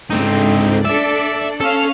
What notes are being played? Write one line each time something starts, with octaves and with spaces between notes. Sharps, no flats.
C#2 G#2 D3 C4 D#4
D4 A4 D5 E5
C#4 A4 F5 F6